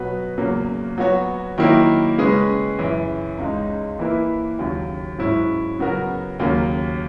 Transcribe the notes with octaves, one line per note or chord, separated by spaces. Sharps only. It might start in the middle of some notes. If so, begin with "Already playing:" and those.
Already playing: B2 F#3 B3 F#4 B4
E2 C#3 F#3 A#3
F#3 B3 F#4 C#5
D#3 F#3 A#3 E4 A#4
C#3 G#3 C#4 G#4 B4
F#2 C#3 E3
C#2 C#3 G#3 D#4
E3 A#3 E4 B4
D#2 C#3 F#3
G#2 F#3 C#4 E4
C#3 F#3 B3 F#4 A#4
D#2 C#3 F#3 A#3